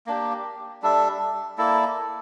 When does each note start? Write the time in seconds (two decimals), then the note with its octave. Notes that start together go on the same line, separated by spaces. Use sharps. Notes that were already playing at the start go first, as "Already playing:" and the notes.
0.07 A#3 D4 G4
0.82 G3 D4 A4 E5
1.58 A#3 E4 A4 D5